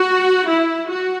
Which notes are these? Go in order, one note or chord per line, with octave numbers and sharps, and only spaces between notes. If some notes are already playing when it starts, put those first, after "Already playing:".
Already playing: F#4
E4
F#4